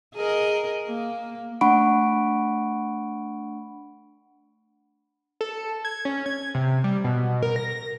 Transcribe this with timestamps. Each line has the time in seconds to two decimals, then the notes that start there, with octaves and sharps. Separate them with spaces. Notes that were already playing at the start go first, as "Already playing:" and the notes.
0.15 G#4 A#4 D#5
0.88 A#3
1.61 A3 D4 F#5 B5 C#6 D7
5.41 A4
5.85 G#6
6.05 C#4
6.26 G#6
6.54 C3
6.84 G3
7.04 B2
7.42 A#4
7.56 A#6